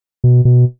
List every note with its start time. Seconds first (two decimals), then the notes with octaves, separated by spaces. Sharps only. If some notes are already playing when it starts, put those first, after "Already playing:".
0.24 B2
0.45 B2